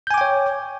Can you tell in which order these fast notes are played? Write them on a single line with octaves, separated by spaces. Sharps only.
G6 G#5 D6 G5 C#5